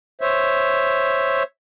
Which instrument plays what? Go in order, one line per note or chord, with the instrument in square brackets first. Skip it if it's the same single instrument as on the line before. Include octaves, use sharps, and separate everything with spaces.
[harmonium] C5 C#5 E5